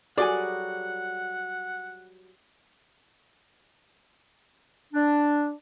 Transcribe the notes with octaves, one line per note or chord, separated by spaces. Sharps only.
F#3 G3 F#4 G#4 A4 D5 F#5 G#5
D4